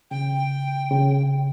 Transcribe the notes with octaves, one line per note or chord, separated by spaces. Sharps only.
C#3 G5
C#3